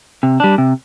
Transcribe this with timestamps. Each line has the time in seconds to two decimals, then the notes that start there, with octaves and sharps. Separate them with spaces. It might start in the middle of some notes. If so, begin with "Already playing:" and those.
0.23 C3
0.40 G3 D4
0.58 C3